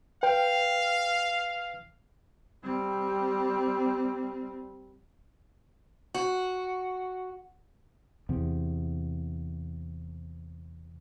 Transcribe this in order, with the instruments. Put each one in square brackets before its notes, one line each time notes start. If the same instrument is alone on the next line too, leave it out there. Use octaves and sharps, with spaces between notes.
[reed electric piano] B4 G5 [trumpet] F5
[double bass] G3 C4
[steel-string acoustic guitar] F#4
[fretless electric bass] E2 C3